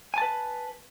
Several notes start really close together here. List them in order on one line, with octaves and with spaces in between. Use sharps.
G#5 A5 B4